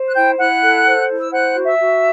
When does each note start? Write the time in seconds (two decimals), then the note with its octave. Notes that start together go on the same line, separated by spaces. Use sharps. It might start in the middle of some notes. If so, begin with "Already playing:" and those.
Already playing: C5
0.08 F#6
0.15 E4 G5 G6
0.38 E4 F#5 F#6
0.62 A4
0.86 C5
1.09 E4
1.20 E6
1.31 C5 F#5 F#6
1.55 F#4
1.66 E5 E6
1.78 F#4